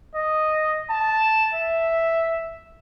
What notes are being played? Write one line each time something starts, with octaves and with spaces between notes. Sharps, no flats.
D#5
A5
E5